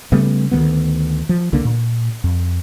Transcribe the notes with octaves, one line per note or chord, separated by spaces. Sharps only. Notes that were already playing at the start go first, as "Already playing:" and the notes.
C#3 G3 A3 B3
D2 D#3 F3 B3
F3
C2 D3 A#3 D4
A#2
F2